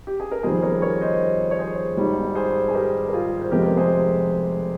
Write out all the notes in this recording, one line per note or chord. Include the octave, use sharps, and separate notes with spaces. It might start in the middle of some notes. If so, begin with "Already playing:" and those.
G4
G#4
A#4
F2 D#3 G3 A#3 G#4 C5
A#4 C#5
A#4 C#5
C5 D#5
C#5
G#4 C5
G#1 G#2 D#3 G3
G#4 C5
G#4
G4 A#4
A#4
F4 G#4
C5
F1 F2 C3 F3 G#3 G4 A#4
A#4
G#4 C5